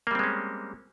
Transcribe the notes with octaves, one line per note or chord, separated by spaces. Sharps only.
G3 G#3 A#3 C4 C#4